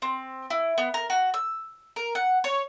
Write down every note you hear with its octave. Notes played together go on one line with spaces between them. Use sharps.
C4
E4
B3
A#4
F#4
E6
A#4
F#5
C#5